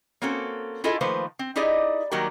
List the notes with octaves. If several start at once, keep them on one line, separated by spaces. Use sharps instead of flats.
A#3 C4 C#4 F#4 A4
E4 F4 G#4 A4 D#5
D#3 F3 A3 A#3 B4 C5
C4
D#4 E4 G4 G#4 D5 D#5
D#3 F#3 G3 A#3 G4 A#4